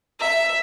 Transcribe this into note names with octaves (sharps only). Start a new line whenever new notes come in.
E5